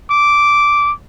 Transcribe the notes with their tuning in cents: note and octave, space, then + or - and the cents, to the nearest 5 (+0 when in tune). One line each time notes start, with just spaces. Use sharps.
D6 -5